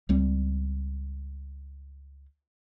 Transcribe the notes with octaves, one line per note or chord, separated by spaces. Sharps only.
C#2 G3 C4